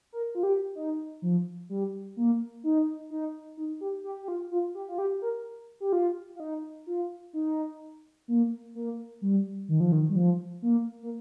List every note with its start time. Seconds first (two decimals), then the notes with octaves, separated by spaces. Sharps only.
0.13 A#4
0.35 F4
0.43 G4
0.75 D#4
1.22 F3
1.69 G3
2.17 A#3
2.64 D#4
3.10 D#4
3.57 D#4
3.81 G4
4.04 G4
4.23 G4
4.28 F4
4.51 F4
4.75 G4
4.89 F4
4.98 G4
5.22 A#4
5.80 G4
5.93 F4
6.35 F4
6.40 D#4
6.87 F4
7.33 D#4
8.28 A#3
8.75 A#3
9.22 G3
9.68 D#3
9.80 F3
9.92 D#3
10.09 G3
10.16 F3
10.62 A#3
11.03 A#3